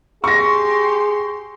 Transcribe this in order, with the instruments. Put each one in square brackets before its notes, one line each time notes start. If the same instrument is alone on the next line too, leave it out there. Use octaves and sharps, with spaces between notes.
[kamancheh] G4 C6 [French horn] G#4 [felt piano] C#6 A#6